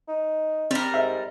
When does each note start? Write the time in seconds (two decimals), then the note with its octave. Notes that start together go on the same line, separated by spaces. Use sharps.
0.08 D#4
0.71 G3 C4 A#4
0.94 G#2 E5